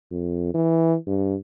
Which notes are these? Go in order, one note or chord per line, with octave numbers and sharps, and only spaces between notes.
F2
E3
G2